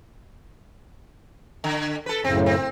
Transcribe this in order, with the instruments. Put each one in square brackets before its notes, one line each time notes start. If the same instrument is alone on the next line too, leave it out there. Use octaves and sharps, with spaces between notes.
[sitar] D3
A4 B4
[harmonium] F#2 A2 C#3 [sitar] C4
[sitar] C4